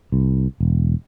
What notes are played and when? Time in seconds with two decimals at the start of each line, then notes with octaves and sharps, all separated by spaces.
0.12 C2
0.60 E1